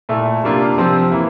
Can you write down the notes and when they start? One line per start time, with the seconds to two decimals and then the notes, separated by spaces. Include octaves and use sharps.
0.09 A#2 A3 E4
0.44 C3 G3 A#3 D4 F4
0.78 C3 F3 C4 F4
1.11 E3 A#3 E4